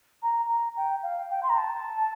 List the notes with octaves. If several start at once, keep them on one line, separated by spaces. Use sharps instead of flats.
A#5
A#5
G5
F5
G5
C6
A#5
A5